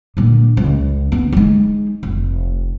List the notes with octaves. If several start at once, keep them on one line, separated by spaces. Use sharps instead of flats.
A#2 D3
C#2
B3
G#3 D#4
F1